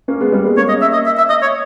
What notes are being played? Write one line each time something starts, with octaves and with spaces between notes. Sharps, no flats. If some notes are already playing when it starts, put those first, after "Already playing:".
A#3 C#4
G#3 B3
G3 A#3
G#3 B3
A#3 C#4 C#5
D#5
E5
D#5
E5
E5
D#5
C#5